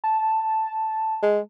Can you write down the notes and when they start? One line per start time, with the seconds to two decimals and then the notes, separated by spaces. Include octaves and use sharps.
0.04 A5
1.22 G#3